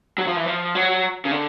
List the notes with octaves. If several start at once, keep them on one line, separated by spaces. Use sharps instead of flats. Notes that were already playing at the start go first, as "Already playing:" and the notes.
F#3
F3
E3
F3
F#3
C#3
D3